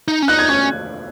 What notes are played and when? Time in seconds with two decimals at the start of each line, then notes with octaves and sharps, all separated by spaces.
0.08 D#4
0.22 C#4
0.28 D#4 F#6
0.39 G#6
0.49 C#4 G#6